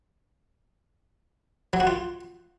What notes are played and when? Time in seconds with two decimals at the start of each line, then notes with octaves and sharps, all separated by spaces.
1.73 F#3
1.80 F#4
1.87 F4